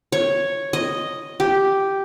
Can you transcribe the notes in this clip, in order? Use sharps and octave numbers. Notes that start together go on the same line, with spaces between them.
C#5
D#5
G4